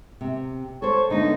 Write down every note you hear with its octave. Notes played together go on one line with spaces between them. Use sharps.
C3
A4 C5 C#5
D3 A3 B3 D#4